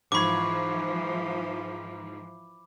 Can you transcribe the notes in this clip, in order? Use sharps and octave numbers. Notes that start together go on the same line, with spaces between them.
G#2 E3 F3 B5 C#6 D6 G#6